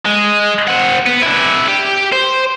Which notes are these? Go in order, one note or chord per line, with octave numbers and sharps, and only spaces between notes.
G#3
C4 F#5
B3
D4 E4
G4
C5